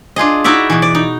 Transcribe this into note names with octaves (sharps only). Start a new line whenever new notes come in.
D4 F4 G#4 D#5
D#4 E4 F#4 D5 E5
B2 E3
D5
D#4